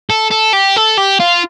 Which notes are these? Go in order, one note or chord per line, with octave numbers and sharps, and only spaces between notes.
A4
A4
G4
A4
G4
F4